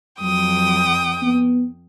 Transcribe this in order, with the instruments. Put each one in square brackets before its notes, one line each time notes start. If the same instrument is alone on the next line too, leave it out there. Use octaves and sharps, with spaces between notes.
[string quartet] F2 G5 D#6 [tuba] F#3
[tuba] B3